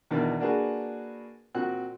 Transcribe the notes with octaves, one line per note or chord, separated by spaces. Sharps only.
E2 B2 D#3 D4 D5 F6
A#3 D4 F#4 G#4 B4
A#2 C4 F#4 F#6